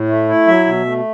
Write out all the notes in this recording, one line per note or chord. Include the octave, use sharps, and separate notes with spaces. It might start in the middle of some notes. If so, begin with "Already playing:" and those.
Already playing: A2
A3
E4
F#3 E5
B2
A3